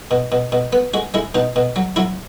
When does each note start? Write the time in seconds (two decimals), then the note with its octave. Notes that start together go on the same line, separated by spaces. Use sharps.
0.11 B2
0.32 B2
0.52 B2
0.73 B3
0.94 G#3 F#4
1.14 G#3 E4
1.35 B2 D#4
1.56 B2
1.76 F#3
1.96 F#3 E4